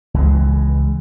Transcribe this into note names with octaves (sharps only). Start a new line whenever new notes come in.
C#2 E3 G#3